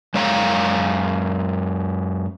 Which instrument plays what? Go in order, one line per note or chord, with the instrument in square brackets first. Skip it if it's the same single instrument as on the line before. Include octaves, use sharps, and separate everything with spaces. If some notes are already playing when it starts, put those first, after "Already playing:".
[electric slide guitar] F#2 G#3 C#5 F5 A#5